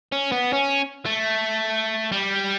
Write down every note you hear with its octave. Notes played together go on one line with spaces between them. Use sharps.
C#4
B3
C#4
A3
G3